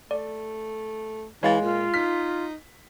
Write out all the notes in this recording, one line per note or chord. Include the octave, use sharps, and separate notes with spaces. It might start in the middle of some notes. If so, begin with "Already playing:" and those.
A3 D5
E3 G#3 C#5 F5 A6
A#2 F4
D#4 F6 B6